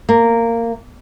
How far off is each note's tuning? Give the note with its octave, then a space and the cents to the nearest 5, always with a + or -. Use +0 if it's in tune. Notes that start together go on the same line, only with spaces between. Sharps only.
A#3 -15